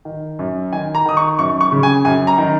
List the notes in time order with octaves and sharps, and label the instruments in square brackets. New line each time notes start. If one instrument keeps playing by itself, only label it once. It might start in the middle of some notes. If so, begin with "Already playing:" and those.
[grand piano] D#3
F#2
D#3 G#5
A#5
D#3 D#6
C#6
F#2 C#6
C#6
C#3
G#5
F#2 G#5
A#5
D#3